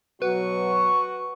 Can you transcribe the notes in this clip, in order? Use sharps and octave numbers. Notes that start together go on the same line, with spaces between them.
B2 F#3 F#4 B4 C#6